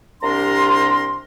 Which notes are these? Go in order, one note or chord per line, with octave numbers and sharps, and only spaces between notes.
C2 C3 D4 A#4 A#5 C6